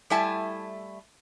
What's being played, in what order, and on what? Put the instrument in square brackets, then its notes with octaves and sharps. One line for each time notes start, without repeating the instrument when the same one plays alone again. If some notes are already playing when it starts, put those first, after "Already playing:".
[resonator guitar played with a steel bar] G3 A3 E4 E5 G#5 A5